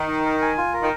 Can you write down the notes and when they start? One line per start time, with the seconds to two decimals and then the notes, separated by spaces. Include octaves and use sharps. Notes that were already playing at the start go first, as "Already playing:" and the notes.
Already playing: D#3
0.08 D#4
0.25 A#4
0.42 G#5
0.58 F4
0.73 A#4
0.81 D#3